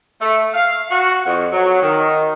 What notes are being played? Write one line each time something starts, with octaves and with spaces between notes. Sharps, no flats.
A3
F5
F#4
F2
F#3
D#3